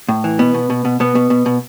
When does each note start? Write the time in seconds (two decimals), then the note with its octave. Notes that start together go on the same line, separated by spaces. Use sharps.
0.09 A2
0.24 E3
0.39 B2 B3
0.54 B2
0.70 B2
0.85 B2
1.00 B2 B3
1.15 B2
1.30 B2
1.46 B2